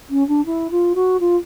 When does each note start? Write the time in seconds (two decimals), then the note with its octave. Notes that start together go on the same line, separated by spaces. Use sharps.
0.09 C#4
0.28 D4
0.45 E4
0.71 F4
0.95 F#4
1.20 F4